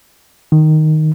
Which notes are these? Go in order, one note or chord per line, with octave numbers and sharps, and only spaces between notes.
D#3